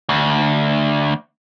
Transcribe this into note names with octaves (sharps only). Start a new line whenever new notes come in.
D2